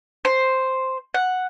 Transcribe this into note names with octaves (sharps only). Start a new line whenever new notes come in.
C5
F#5